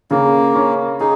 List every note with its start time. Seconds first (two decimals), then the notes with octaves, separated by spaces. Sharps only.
0.11 C#3 A#3
0.55 C#4
1.00 D#4 G#4